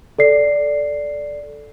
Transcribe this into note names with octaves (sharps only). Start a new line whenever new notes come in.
A4 D5 C7